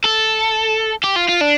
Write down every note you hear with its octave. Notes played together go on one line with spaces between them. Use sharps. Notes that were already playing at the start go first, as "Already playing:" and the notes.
A4
G4
F4
F4
D4